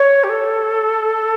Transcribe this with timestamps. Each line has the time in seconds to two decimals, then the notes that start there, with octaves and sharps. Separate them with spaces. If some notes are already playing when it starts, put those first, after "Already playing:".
Already playing: C#5
0.24 G4
0.29 A4